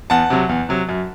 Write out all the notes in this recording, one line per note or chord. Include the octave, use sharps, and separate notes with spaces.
E2 F#5 A5
C3 F#3
E2
C3 F#3
F#2